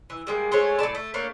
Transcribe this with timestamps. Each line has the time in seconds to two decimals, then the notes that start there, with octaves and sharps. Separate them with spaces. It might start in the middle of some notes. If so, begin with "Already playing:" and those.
0.10 E3
0.27 G3 G#3 A#3
0.52 G#3 A3 C5 C#5
0.79 A2 F#3 D5 A5
0.95 A3
1.14 A3 A#3 D4 C#5